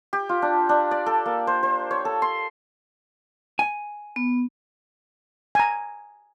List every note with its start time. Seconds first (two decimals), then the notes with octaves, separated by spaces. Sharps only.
0.13 G4
0.29 F4
0.42 D4
0.69 D4
0.91 D5
1.06 A4
1.26 A#3
1.47 C5
1.63 C5
1.91 C#5
2.05 A4
2.22 C6
3.59 G#5
4.16 B3
5.55 G#5 A#5